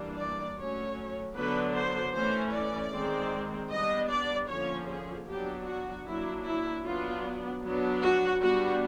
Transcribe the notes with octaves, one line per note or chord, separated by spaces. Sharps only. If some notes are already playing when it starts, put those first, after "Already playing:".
Already playing: E3 G3 A#3 D4
D5
F#3 A3 C#4 C#5
D3 F#3 B3 D4 B4
C5
E3 A3 C#4 C5
D5
D#3 G#3 C4
G3 B3 D4 D#5
D5
D3 F3 A#3 C#4 C#5
G#4
F#3 B3 D4 G4
F#4
F#3 A#3 D4 E4
E4
F#3 B3 D4 F4
F#3 B3 D4
F#4
G3 B3 D4 F#4